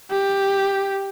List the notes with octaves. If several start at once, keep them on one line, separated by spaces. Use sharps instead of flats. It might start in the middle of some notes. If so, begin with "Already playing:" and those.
G4